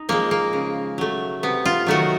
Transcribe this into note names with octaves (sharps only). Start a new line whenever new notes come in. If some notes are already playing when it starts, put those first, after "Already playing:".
Already playing: D#4
F3 G#3 A#3
A#3
C#3
F#3 A3
C3 B3
F4
D#3 F#3 A3 F#4